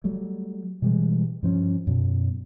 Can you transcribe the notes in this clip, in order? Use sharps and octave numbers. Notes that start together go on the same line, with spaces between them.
F#3 G3 A3
B2 E3 G3 G#3
G2 F3 C4 C#4
F#2 B2